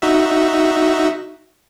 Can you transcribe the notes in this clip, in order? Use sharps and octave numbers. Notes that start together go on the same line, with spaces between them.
D#4 F#4 E5